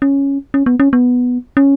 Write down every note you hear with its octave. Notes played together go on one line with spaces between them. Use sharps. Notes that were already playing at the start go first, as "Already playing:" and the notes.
C#4
C#4
B3
C#4
B3
C#4